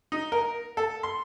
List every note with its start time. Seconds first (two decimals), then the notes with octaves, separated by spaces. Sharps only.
0.12 D#4
0.32 A#4
0.77 A4
1.03 C6